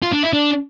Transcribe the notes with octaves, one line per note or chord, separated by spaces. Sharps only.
F4
D4
E4
D4